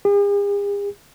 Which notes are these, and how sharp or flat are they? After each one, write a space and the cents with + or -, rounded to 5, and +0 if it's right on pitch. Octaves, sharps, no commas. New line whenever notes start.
G#4 -45